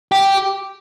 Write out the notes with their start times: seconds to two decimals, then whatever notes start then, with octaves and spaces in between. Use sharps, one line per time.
0.12 G4